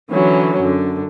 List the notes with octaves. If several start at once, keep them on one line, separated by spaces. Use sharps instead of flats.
D3 E3 F#3 C#4
F#2 D3